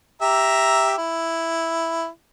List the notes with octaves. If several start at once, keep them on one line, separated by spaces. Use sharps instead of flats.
G4 E5 A#5
E4